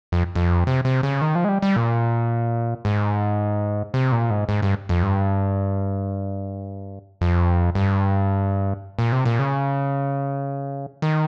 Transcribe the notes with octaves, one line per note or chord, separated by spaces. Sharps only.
F2
F2
C3
C3
C#3
D#3
F3
G#3
G3
G3
A#2
G#2
C3
A#2
G#2
G#2
G2
F2
G2
F2
G2
A#2
C3
A#2
C#3
D#3